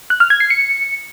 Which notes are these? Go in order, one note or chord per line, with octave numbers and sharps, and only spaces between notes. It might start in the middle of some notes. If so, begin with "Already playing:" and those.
F#6
F6
G#6
C7
C#7